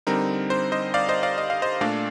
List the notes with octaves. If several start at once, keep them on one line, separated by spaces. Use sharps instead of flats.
D3 G3 C4 D#4 A#4
C5
C5 D#5
D5 F5
C5 D#5
D5 F5
D#5
F5
C5 D#5
A#2 A3 D4 D5 F5